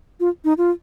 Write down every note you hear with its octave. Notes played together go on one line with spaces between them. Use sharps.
F4
D#4
F4